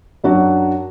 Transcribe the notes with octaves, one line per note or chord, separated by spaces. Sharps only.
F#2 F#3 D4 F#4